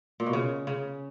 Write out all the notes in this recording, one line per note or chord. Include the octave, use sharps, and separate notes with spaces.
A#2
B2
C#3
C#3